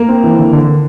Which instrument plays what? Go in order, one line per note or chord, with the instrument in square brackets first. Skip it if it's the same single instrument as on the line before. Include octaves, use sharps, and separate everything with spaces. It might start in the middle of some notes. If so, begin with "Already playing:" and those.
Already playing: [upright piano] A#3 A#4
[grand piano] C4
E3
D3
D3